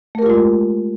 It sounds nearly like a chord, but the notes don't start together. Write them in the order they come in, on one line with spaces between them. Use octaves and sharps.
A3 A#4 G4 F4 G#3